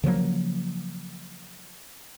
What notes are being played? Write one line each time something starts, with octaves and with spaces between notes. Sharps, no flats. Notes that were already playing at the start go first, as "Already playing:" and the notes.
C#3 F3 F#3 A#3